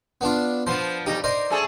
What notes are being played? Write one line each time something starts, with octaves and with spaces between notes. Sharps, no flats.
B3 D4 F4
F3 B3 D4 C5 D#6
F2 G3 D#4 G4
A#4 C5 D5 D#5
A3 G#4 A4